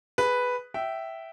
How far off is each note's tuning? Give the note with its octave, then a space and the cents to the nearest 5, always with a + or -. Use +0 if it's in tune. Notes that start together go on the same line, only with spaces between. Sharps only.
G#4 +0 B4 +0
E5 +0 G5 -20